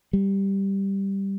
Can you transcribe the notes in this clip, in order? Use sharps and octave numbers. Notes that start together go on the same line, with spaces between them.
G3